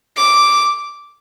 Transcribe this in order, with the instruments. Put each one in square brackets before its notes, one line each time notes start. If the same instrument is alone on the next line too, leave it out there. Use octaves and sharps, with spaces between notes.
[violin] D6